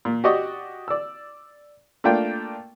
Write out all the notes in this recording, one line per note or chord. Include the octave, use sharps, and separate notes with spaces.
A#2
F#4 G4 D5 D#5 C#6
D5 E6
A3 A#3 D4 F4 G5